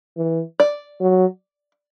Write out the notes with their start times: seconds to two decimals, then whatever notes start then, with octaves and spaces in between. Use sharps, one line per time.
0.17 E3
0.60 D5
1.01 F#3